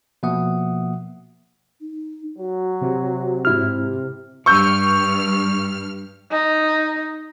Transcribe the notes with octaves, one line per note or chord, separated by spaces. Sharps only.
B2 F3 A#3 E5 F#5 D#6
D#4
F#3 F#4
C3
G#2 E4 F6
G2 C#6 E6 F6 G6
D#4